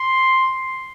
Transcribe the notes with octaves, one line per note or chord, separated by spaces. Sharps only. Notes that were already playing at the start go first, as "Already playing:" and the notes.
Already playing: C6